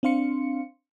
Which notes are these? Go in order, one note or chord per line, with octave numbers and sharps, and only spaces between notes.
C4 D4 F5 C6 C#7